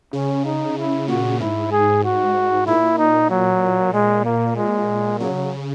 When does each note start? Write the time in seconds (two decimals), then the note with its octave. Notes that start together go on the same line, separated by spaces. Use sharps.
0.13 C#3 C#4
0.45 D#4
0.78 E4
1.08 A#2 F#4
1.40 G#2 E4
1.72 G#4
2.04 F#4
2.66 A#2 E4
2.98 D#4
3.30 F#3
3.94 A#2 G#3
4.25 A#3
4.56 G#3
5.19 C#3 F#3